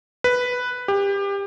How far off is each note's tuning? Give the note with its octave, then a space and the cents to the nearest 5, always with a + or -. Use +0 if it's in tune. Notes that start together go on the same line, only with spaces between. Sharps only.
B4 +0
G4 +25